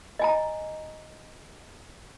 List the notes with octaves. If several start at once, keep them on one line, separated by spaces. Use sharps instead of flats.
D#5 G#5 A#5